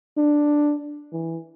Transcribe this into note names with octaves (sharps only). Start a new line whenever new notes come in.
D4
E3